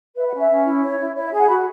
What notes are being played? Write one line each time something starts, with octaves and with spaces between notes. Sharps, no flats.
B4 E5
F#5
C#4
E5
C#4
E4
C#5
E4
E4 C#5
E5
G#4
F#5
F#4 B5